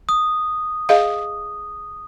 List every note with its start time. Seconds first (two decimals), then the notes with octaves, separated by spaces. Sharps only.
0.09 D#6
0.89 G#4 D#5 F5